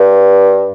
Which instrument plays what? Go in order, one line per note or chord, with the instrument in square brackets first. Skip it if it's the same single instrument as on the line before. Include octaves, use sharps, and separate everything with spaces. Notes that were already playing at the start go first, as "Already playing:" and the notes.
Already playing: [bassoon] G2